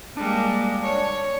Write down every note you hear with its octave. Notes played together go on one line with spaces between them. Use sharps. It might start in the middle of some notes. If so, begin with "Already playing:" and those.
G3 G#3 A#3 D4
C#5